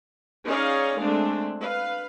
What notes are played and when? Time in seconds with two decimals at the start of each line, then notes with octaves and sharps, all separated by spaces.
0.48 C#4 D#4 G#4 C#5 D5 F5
1.01 G#3 A3 C4 D4
1.62 B4 F5